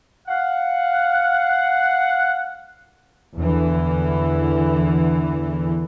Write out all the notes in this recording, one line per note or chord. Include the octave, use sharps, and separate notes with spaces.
F5 F#5
E2 D3 E3